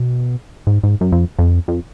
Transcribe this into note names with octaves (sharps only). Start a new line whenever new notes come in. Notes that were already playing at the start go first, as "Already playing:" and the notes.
Already playing: B2
G#2
G#2
F#2
F2
F2
F2